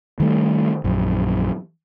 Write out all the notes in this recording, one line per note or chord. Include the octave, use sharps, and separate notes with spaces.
D#3 G3 A3
A#1 F#2